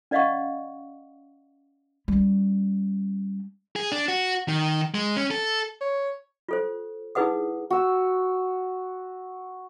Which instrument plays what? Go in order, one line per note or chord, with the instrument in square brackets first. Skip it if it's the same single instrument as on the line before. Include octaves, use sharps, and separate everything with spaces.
[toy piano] C#4 D5 D#5 F5 F#5 C#6
[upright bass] G3 C#4
[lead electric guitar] G#4
D4
F#4
D#3
G#3
C#4
A4
[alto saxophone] C#5
[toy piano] F4 A4 C5
D#4 E4 G#4 B4 F#5 D#6
[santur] F#4 E6